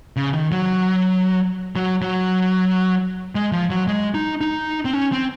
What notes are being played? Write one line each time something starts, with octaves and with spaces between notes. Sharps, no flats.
C#3
D#3
F#3
F#3
F#3
G#3
F3
F#3
G#3
D#4
D#4
C4
C#4
C4